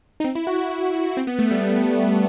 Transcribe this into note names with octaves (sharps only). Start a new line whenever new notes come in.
D#4
C4
E4
F#4
E4
C4
B3
A3
G3